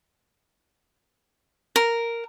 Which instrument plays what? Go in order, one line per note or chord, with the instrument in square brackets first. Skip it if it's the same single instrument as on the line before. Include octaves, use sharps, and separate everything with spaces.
[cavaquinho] A#4